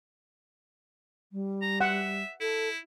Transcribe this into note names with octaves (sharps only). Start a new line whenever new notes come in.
G3
A#5
E5 F#5
E4 A4